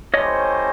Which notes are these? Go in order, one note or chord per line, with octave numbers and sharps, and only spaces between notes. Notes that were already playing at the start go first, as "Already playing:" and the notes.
A3 C#4 E4 G4 C5 C#5 D#5